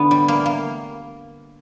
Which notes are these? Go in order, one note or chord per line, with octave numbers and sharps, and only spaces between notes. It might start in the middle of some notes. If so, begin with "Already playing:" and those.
Already playing: D3 B3
G3
A#3
A#3